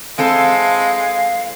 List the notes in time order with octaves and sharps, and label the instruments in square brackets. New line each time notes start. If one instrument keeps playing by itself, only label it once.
[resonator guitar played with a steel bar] E3 C4 A4 [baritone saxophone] G#3 [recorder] F5